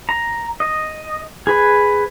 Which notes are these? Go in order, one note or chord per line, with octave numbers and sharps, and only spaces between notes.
A#5
D#5
G#4 B4